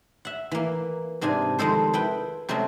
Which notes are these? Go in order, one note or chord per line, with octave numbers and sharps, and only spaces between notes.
E5 F#5
E3 A#3
G#2 C3 D4 G#5
F2 D#3 G#3 A4 C5
E4 B4 G5
C3 F#3 G#3 A3 C#4